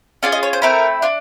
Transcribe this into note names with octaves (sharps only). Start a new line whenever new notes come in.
C#4 F4 G#4 D5
D#5
C#5
C5
A3 C4 E4 A#4
D4 F4